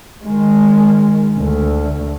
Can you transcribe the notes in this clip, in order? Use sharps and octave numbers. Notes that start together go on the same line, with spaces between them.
D#3 G#3
D2